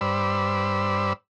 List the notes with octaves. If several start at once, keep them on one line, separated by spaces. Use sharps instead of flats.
G2 C5 D5 B5 E6